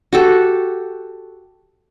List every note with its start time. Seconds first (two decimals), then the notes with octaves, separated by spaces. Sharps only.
0.13 F#4 G4 A4